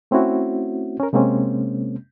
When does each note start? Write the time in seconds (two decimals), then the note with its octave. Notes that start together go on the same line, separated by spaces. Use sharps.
0.11 A3 C4 C#4 E4 F#4
1.00 C#4 A#4
1.13 C3 G#3 A#3 C4 C#4